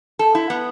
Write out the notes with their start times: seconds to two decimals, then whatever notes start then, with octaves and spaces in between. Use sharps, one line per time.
0.19 A4
0.35 E4
0.50 B3